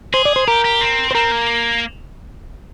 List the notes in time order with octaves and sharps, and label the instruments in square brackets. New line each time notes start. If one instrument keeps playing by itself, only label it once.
[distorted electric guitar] G#4 [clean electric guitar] C5
[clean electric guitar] D5
C5
[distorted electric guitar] G4 [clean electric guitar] A#4
[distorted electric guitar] G4
C4
[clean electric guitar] C5
[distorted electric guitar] C4 [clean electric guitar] A#4
[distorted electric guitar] A#3